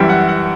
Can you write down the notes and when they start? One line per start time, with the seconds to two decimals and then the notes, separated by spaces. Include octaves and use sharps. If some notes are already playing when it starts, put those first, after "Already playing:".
Already playing: F#2 E3 G3 G5
0.09 F#5
0.28 F#5